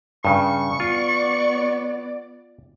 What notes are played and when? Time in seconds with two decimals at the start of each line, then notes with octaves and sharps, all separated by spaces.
0.25 G2 C#3 C#6
0.80 B3 F4 D5